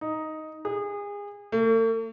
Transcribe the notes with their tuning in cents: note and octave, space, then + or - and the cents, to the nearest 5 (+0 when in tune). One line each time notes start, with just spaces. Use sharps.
D#4 +5
G#4 -30
A3 +45